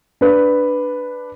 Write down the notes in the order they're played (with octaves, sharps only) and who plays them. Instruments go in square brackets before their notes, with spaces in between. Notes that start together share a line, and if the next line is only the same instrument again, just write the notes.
[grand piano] D4 B4